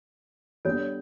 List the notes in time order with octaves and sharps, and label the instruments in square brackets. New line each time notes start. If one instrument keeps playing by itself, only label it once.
[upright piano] G3 B3 D4 [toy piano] A4 C#5